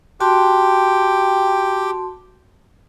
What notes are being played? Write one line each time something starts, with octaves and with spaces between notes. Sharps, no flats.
F#4 G4 G5 A5 C6